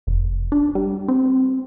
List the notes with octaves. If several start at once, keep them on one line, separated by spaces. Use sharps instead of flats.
F1
D4
G3
C4